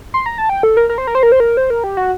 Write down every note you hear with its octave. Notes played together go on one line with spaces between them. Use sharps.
C6
A#5
A5
G5
A4
A#4
A#4
C5
A#4
C5
A#4
C5
A#4
C5
A#4
G4
F#4